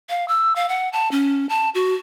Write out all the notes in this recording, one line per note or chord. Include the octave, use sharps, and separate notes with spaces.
F5
E6
F5
F#5
A5
C#4
A5
F#4